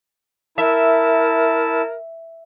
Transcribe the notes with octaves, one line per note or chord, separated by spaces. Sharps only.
E4 A#4 E5 A5